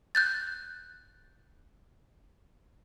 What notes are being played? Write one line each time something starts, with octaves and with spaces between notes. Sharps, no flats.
F#6 G6 A6